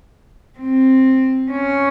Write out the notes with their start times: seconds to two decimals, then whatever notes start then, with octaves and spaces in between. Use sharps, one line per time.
0.59 C4
1.51 C#4